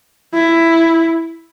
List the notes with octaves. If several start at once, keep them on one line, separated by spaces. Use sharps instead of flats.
E4